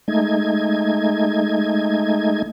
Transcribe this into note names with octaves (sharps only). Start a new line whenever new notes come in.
G#3 A3 D#4 G#6